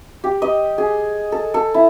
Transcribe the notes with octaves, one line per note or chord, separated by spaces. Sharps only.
G4
D#5
G#4
A4
A4
E4